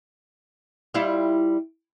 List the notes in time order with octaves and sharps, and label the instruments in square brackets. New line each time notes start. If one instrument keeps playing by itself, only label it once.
[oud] G3 E4 F4